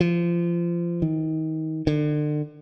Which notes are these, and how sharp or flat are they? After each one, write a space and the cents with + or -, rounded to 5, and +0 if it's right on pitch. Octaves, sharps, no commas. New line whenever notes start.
F3 -25
D#3 +25
D3 +35